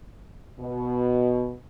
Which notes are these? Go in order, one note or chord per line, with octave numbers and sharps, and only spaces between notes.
B2